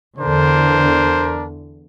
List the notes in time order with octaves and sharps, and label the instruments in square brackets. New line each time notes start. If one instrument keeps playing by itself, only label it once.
[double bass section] E2 D3 [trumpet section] D4 A#4 [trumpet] C5